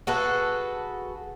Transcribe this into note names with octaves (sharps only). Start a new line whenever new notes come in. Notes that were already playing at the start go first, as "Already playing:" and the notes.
F#4 G#4 A4 B4